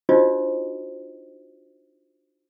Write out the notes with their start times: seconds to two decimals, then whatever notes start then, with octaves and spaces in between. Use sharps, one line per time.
0.09 D4 D#4 F4 F#4 C5 D#5